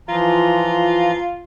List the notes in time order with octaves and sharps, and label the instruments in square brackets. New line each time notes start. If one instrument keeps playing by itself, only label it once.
[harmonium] E3 F3 A#5 [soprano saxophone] F4